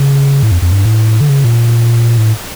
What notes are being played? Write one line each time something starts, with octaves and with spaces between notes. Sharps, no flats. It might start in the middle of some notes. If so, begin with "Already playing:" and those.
Already playing: C#3
A2
F2
F2
G2
A2
D3
C#3
A#2
A2